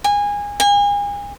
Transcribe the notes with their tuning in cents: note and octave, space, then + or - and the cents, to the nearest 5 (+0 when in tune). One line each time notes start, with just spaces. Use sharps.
G#5 -20
G#5 -35